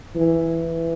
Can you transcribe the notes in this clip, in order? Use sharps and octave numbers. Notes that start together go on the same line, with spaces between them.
E3